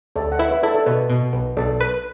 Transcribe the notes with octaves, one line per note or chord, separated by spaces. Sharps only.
D2 A4 D5
F#5
E4 B4 E5
B4 E5
E4 A4 D5
A4 D5
B2 B4
B2
B1 B4
B1 A4 D5
B4